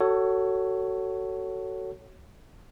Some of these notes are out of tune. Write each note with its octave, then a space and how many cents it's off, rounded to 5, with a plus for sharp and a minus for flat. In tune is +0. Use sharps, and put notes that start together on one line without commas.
F#4 +25 A4 +20 C#5 +0